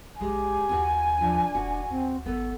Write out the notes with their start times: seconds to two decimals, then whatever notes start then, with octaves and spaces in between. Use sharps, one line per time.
0.21 A#1 G#3 G4 G#5
0.69 D#2 C#4 F#4
1.21 F3 D4
1.55 E1 F#4
1.90 D2 C4
2.26 G#1 B3 A4